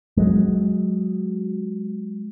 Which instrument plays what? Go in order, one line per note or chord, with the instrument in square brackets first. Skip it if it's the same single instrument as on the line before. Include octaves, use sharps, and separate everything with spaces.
[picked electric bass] F#3 G#3